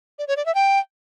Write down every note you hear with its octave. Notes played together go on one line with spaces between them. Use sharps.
D5
C#5
D5
E5
G5